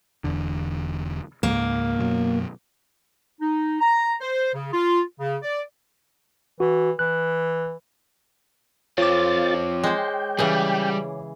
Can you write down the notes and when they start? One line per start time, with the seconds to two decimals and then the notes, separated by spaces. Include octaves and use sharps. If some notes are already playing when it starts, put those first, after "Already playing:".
0.24 E1 E2 D3
1.43 C#2 G#2 A#3
1.99 F#2 B2 F#3
3.41 D#4
3.80 A#5
4.21 C5
4.54 C#3
4.73 F4
5.20 C#3
5.43 D5
6.60 E3 F#4
6.99 E3 F#6
8.98 F3 C4 F4 C#5 D6 A6
9.83 G#3 C5 G5
10.38 C#3 E3 G3 G#4